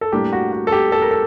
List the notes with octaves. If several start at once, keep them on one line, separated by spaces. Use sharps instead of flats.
A4
A2 G3 A#3 D4 G4
F#4
F#4
A4
G4
A4
A#4
A4